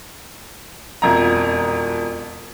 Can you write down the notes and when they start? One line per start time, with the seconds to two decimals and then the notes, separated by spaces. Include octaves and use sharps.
1.02 E1 F2 A#5